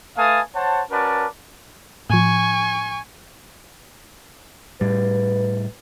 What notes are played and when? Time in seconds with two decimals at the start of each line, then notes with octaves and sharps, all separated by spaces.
0.18 A3 B4 F5 G#5 A5 D#6
0.55 C5 C#5 F#5 A5
0.91 C#4 F#4 A#4 B4 D5 A5
2.10 A2 F3 G#5 C#6
4.81 A2 G3 B4